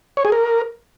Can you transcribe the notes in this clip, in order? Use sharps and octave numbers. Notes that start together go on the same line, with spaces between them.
C#5
G#4
A#4